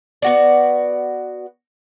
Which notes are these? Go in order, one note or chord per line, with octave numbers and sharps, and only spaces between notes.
B3 F#4 D5